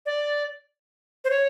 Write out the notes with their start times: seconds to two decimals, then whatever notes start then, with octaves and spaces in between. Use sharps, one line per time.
0.06 D5
1.25 C5
1.30 C#5